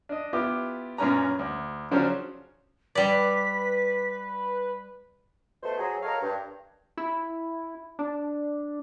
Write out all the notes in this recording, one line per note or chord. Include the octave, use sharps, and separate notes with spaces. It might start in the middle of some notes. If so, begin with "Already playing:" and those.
D4 D#5
B3 E4 F4 G4 D6
F#2 A#2 A#3 C#4 B4 A#5
D2
C#3 F3 F#3 C#4 D4 C5
G3 B4 D5 B6
B2 A3 C5
F#3 G#4
A4 A#4 C#5 D#5 F5
G2
E4
D4